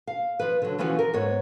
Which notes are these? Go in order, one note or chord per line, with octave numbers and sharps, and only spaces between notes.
F5
F3 B4
D3 F#3
E3 F3 C#4 E4 F#4 B4
A#4
G#2 B3 C#5